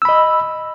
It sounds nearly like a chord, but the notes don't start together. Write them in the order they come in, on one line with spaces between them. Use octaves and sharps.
E6 B5 D#5